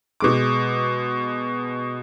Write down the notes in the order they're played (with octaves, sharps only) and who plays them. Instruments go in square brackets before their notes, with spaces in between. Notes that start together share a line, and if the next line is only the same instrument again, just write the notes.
[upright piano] B2 G#3 D6